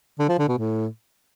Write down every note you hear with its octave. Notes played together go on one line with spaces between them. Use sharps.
D3
F3
D3
B2
A2